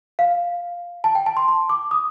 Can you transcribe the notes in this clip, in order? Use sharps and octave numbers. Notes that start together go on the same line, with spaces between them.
F5
A5
G5
A5
C6
C6
D6
D#6